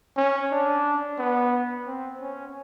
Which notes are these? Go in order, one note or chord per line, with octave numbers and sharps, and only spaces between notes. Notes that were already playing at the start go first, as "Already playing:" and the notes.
C#4
D4
B3
C4
C#4